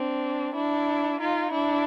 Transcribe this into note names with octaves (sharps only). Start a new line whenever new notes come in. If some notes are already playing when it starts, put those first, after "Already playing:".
Already playing: C4 D4
D4 E4
D#4 F4
D4 E4